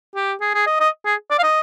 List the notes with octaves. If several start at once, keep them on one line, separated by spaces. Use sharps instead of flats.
G4
G#4
G#4
D#5
D#5
G#4
D5
F5
D#5